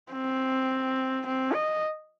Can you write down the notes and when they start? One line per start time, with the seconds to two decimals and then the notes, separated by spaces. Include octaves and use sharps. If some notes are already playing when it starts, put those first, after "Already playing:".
0.12 C4
1.26 C4
1.54 D#5